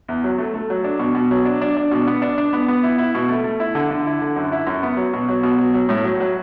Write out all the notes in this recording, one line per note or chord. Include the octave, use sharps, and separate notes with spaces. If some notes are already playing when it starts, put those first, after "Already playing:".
E2
F#3
A3
A3
F#3
D4
B2
B2
F#3
D4
D4
D4
B2
B3
D4
D4
B3
B3
E4
E4
B2
A3
A3
E4
D3
D3
E4
D3
F#2
E4
F#2
B3
F#3
B2
F#3
B2
F#3
F#3
A2
F#3
F#3